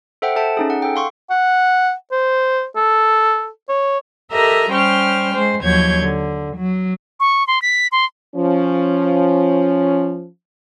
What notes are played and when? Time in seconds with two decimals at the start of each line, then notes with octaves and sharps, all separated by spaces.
0.22 A4 C5 E5 F#5 G5
0.36 A4 E5 A5
0.57 C#4 D#4 G#4
0.70 F#5
0.82 A4 G5
0.96 F5 C6 C#6
1.30 F#5
2.12 C5
2.76 A4
3.69 C#5
4.32 G4 A4 A#4 D#5 E5 A#5
4.71 G3 C#4 C5 G5 C#6 F6
5.33 G#3 C5
5.62 D#2 F3 F#3 C#5 G6 G#6
6.00 D3
6.56 F#3
7.20 C#6
7.47 C6
7.62 B6
7.92 C6
8.35 F3 C#4